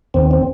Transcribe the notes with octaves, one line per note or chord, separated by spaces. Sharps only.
D#2 C4
C4